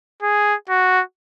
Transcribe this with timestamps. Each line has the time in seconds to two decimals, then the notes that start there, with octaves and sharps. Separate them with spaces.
0.22 G#4
0.69 F#4